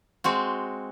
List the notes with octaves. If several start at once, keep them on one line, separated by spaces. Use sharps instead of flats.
G#3 C4 F#4